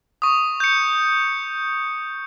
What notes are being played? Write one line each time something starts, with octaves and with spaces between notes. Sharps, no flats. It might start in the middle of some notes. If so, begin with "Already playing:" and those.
C#6 D#6
G6 C#7